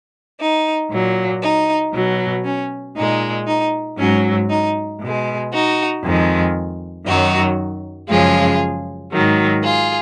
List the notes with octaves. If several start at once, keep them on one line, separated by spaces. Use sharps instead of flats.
D#4
A#2 F#3
D#4
B2 F#3
C#4
A#2 G#3 D#4
D#4
G#2 F#3 C#4
D#4
B2 G#3
D#4 F#4
F2 D#3 G#3
F#2 D#3 F#3 D#4 F#4
F#2 C#3 F3 G#3 F4 G#4
G#2 D#3 F#3
F4 G#4